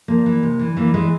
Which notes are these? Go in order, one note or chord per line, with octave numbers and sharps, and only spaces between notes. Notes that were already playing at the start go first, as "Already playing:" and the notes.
F3 A#3
E3
C3
E3
E3 A#3
E3 G#3